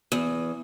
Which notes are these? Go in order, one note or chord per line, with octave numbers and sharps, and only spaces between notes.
E2